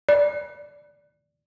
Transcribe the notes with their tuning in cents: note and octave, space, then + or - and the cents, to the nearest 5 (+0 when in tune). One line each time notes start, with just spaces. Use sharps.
D5 -5